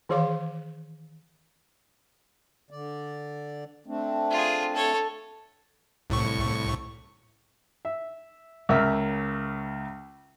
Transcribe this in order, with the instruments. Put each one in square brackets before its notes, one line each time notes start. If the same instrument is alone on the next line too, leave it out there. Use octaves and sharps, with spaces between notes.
[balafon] D#3 E3 G#4 C#5 F5 D6
[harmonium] D3 D5
A3 C4 D4
[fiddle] F4 G#4
A4 C#5
[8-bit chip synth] C2 A2 C#6
[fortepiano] E5
C#2 C#3 A#4 E5 F6